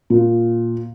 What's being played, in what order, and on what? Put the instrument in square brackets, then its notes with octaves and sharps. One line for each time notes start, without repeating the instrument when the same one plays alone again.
[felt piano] A#2